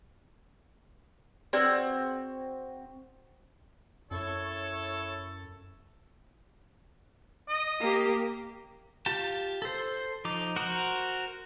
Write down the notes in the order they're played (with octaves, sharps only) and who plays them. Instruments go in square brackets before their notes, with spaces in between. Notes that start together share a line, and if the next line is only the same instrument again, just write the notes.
[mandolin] C4 F#4 [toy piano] G#4 B4 D5
[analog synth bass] F#2 [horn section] E4 C#5 [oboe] A4
[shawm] D#5
[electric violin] A#3 G4
[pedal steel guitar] F4 G4 A5
A4 C5
F3 D#4 D6
F#4 A#4 C5 F#5